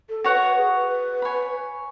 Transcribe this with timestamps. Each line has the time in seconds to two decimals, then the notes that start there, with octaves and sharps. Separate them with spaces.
0.09 A4
0.24 F#4 B4 C#5 F#5
0.41 B4
0.58 G#4
0.74 B4
1.22 C#5 G#5 B5